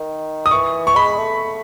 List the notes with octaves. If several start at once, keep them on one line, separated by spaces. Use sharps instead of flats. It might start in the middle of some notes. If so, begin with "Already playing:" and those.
Already playing: D#3
D#6
E3 C#6
C#6
G#3 B5
A3